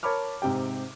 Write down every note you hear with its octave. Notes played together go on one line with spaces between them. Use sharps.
A#4 C#5 A5 B5 D6 F6
G#2 C3 G4 G5